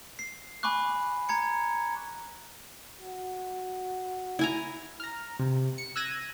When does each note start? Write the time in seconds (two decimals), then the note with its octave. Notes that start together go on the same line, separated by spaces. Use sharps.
0.19 C7
0.63 G#5 B5 C#6 D6 F#6
1.29 A#5 G#6 C#7
3.01 F#4
4.39 E4 G#5 A#5
5.00 A#5 F6
5.39 C3
5.78 C#7
5.96 E6 F#6 G#6 A#6 D#7